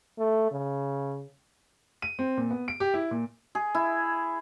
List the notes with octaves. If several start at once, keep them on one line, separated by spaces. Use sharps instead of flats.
A3
C#3
D#7
C4
A#2
B3
D7
G4
E4
A#2
G#4
E4